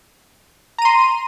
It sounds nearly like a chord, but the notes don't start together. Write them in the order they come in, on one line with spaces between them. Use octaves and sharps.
A#5 D#7 C6